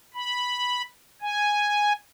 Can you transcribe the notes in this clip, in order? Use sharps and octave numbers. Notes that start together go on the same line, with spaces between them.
B5
G#5